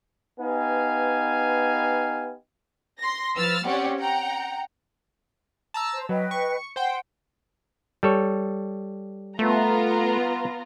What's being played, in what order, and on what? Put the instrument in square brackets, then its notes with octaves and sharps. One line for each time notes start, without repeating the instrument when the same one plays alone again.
[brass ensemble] B3 D#4 G4 B4 F5 G#5
[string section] C6 A#6
F3 B4 E6 F6 A6
C4 C#4 G4 C#5 D5 F#5
F#5 G5 A#5
[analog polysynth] A5 A#5 E6
[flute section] C5
[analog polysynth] F#3 [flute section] B4 D#5 G5
[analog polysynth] C#6
[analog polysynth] C5 G5 [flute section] F#5
[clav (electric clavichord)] G3 A4 C#5
[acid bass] A3 [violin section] B3 F4 A#5